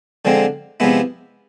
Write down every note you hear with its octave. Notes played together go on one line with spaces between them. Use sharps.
D3 F3 G#3 C4
C3 F3 G#3 B3 E4